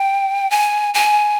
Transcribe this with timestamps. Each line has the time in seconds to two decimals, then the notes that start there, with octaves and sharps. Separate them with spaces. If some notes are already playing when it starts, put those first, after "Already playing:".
Already playing: G5
0.51 G#5
0.94 G#5